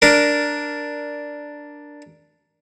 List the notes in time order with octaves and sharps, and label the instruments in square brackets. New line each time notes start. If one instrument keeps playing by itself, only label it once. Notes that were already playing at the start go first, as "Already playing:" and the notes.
[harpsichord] D4 A#4